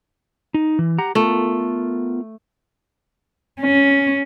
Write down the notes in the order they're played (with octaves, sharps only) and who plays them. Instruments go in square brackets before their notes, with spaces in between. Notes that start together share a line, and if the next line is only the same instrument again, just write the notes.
[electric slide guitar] D#4
E3
G4 F#5 A#5
[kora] A3 [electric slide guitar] B3 F4 A#4
[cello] C#4